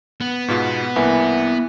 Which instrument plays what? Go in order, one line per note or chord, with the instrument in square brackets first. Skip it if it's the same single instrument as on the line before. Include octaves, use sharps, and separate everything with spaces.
[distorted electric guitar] B3
[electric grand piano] G#2 B2 F4
[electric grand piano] C2 A#3 [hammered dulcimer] E3